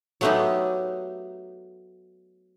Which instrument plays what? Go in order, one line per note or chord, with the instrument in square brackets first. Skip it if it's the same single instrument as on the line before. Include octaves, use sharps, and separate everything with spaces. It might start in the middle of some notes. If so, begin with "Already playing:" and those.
[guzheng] F#3 A3 B3 C#4 D#4 G4